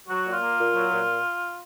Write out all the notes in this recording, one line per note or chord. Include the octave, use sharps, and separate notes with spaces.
F#3 F#4
A#2
F4
A#3
A#2
F#3
A#2